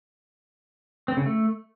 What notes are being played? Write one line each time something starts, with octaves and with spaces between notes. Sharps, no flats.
C4
C#3
A3